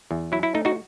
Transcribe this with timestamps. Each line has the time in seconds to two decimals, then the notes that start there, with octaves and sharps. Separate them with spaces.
0.11 E2
0.32 F#3 E4
0.43 E4
0.55 A3 D#4
0.65 D#4 F#4